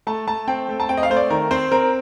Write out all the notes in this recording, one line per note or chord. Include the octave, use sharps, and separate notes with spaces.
A3 A5
A3 A5
C4 G5
A3
A5
C4 G5
D#5
F5
A3 C5
D5
D#3 A#4
C4 C5
C4 A#4